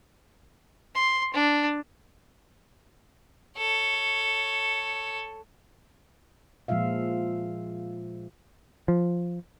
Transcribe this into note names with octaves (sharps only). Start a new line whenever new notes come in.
C6
D4
A4 C#5
A#2 F3 G#3 F4 E5 F5
F3